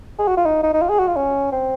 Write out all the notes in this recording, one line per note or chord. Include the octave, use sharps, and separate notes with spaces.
G#4
F#4
F4
D#4
D#4
D#4
F4
G#4
F#4
F4
C#4
C4